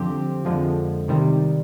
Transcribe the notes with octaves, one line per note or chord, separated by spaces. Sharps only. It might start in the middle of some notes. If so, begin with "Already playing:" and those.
Already playing: F2 D3 F3 C4 G4
F2 D3 F3 G#3
C3 D#3 G3